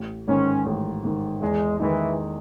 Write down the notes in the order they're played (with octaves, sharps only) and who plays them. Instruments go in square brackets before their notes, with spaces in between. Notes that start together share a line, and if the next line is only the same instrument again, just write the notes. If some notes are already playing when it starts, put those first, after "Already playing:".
Already playing: [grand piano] A1
[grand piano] G#2 D#3 [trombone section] C#4
[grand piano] A1
G#2 D#3
[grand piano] E2 [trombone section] G#3
[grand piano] D#3 G#3 D#4 [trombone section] E3